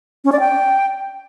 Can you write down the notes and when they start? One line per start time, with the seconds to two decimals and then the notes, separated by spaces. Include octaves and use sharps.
0.25 C#4
0.32 D5
0.40 G5